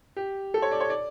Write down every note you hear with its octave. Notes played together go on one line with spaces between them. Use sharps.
G4
A4
C#5
D5
C#5
D5